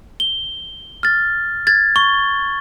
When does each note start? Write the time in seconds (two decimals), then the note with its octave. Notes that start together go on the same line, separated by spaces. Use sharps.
0.20 G7
1.03 F6 A6
1.67 G#6 A6
1.96 C#6 G7